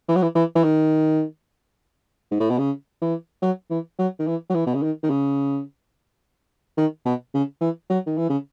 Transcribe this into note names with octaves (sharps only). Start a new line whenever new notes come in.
E3
F#3
E3
E3
E3
D#3
G#2
A2
B2
C#3
E3
F#3
E3
F#3
D#3
E3
F#3
E3
B2
C#3
D#3
D#3
C#3
D#3
B2
C#3
E3
F#3
D#3
E3
C#3